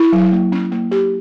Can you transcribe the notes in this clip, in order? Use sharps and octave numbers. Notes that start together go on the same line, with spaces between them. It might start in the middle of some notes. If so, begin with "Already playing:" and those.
Already playing: E4
F#3
A#3
C#4
A#3
G4